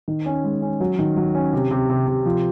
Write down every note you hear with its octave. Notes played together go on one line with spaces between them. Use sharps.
D#3
C#4
G#3
C#4
F#3
D#3
F#3
C#4
C3
C3
C3
C3
F3